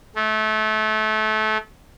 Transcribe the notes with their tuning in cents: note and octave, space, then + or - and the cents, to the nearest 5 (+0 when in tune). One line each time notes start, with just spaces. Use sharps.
A3 -25